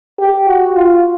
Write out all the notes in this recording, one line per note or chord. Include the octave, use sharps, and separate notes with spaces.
G4
F#4
F4